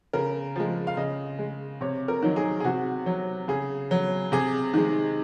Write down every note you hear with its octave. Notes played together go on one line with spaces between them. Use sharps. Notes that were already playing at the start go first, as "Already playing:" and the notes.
C#3 A#4
F3 G#3
F5
C#3 D#5
G#3
C3 C#5
A#4
D#3 F#3
G#4
G#4
C3 F#4
F#3
C#3 G#4
F#3
C3 G#4
D#3 G#3